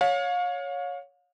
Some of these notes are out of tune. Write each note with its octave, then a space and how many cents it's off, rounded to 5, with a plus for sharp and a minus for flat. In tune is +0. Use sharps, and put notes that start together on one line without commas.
C#5 +5 F5 +35